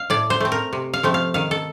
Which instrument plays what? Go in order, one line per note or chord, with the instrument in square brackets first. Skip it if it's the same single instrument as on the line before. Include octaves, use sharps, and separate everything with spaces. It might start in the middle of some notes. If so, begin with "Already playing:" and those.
Already playing: [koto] F5
A2 D5
C5
A3 C4
A#4
C3
F5
F3 A3 C4
F5
D#3 F5
A4